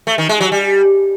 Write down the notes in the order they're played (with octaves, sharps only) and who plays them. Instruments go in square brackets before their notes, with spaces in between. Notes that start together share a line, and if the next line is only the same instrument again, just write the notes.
[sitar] A3
D#3
G#3
F#3
G3